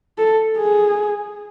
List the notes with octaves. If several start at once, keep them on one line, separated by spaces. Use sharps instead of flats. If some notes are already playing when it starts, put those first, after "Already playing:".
A4
G#4